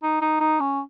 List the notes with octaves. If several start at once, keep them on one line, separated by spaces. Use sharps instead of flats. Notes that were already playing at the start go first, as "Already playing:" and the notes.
D#4
D#4
D#4
C#4